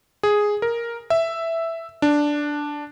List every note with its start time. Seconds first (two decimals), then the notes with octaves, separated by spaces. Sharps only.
0.23 G#4
0.62 A#4
1.10 E5
2.02 D4